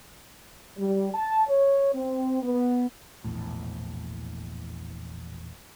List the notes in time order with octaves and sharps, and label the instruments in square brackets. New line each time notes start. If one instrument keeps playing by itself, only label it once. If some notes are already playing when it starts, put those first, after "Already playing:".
[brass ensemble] G3
A5
C#5
C4
B3
[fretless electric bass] E1 A#1 E2 A2